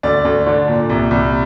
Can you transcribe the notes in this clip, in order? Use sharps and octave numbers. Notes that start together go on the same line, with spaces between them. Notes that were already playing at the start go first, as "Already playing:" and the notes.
D2 D5
D2
D3
A#2
C2
C2